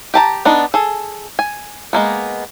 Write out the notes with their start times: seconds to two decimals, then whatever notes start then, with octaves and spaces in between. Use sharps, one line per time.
0.14 G4 A5 A#5
0.45 B3 D4 D#4
0.74 G#4 A4
1.39 G#5
1.93 G#3 A#3 B3